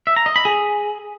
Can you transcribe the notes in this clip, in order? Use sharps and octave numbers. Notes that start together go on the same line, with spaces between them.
E5
A#5
D#5
B5
G#4